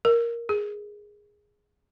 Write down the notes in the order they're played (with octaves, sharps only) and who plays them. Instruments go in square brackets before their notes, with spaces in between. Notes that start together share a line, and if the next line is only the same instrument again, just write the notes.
[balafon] A#4
G#4